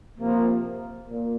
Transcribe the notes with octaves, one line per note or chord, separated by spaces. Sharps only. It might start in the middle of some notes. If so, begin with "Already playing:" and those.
C3 F3 A#3
A#2